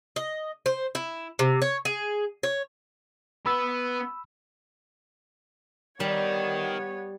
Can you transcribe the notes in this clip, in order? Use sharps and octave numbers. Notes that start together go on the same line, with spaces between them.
D#5
C5
E4
C3
C#5
G#4
C#5
B3 B5 E6
D#3 G3 B3 C#5